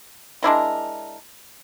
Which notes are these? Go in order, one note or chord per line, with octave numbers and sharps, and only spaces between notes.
G#3 D4 E4 A#4